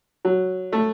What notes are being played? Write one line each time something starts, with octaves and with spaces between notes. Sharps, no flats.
F#3
A3